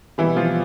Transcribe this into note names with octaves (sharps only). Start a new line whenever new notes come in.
B2 E3 G3 E4
F3 F4